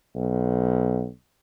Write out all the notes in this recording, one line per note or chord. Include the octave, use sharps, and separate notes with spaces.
B1